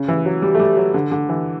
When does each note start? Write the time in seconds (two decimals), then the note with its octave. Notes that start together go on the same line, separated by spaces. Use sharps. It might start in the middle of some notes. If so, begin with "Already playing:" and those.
Already playing: C#3
0.08 E3
0.25 F#3
0.42 G3
0.55 A3
0.59 G3
0.77 F#3
0.94 D3
1.12 D3
1.29 E3